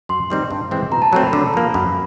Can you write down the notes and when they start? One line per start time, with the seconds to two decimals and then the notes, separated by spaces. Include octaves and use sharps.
0.09 F#2 C6
0.30 D#3 G3 C4 D#4
0.51 G2
0.71 E3 G#3 C4
0.92 B2 A#5
1.02 A5
1.12 F#3 A3 C4 A#5
1.23 B5
1.33 D3
1.54 F3 A#3
1.74 F#2 B5